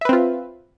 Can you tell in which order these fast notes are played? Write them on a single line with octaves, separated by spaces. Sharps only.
E5 B4 C4 F4